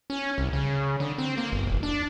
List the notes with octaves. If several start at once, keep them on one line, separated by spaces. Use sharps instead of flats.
C#4
C2
C#3
D3
C4
A#3
G1
E1
D4